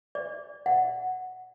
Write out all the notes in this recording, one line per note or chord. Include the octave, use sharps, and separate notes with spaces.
D5
F#5